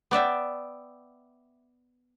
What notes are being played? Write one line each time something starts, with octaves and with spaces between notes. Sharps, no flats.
B3 D5 E5 G5